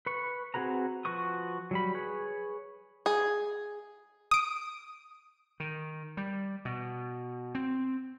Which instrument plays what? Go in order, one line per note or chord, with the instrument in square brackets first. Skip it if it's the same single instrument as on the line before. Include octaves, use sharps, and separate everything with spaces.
[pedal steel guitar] B4 C#6
C4 F#4 G#4 B4 A#5
F3 F#4 B4 C#6 D#6
F#3 G3 B5
G#4 B4 C#5
[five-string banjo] G#4
[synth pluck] D#6 D7
[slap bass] D#3
G3
B2
C4